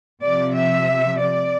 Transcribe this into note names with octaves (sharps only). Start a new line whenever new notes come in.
C3 F3 D5
E5
D5